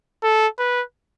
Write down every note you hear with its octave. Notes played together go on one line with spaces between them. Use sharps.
A4
B4